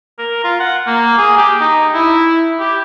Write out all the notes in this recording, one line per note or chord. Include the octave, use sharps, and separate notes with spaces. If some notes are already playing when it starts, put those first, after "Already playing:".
A#4
F4
F#5
A#3
G#4
G4
D#4
E4
G4